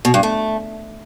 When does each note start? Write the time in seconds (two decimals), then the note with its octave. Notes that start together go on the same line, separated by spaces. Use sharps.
0.05 B2
0.14 G2
0.23 A3